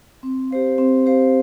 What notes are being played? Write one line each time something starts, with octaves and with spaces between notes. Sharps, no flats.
C4
G4 C5 F5
C4
G4 C5 F5